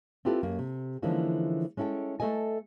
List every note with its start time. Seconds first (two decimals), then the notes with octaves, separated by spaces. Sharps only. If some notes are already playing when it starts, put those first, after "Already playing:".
0.25 C4 E4 F4 G4 A4 B4
0.43 F#2 A#3
0.59 C3
1.02 D3 E3 F3 G#3 A#3 C#4
1.77 G#3 C#4 E4 A4 G5
2.20 A3 A4 B4 D#5 G#5